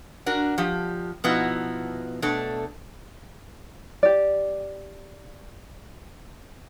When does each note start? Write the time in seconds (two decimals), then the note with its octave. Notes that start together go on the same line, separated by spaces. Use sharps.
0.26 D4 F#4 A#4
0.58 F3 G4
1.24 B2 F3 B3 D#4 E4 F#4
2.22 B2 A3 D4 A4
4.03 G4 D5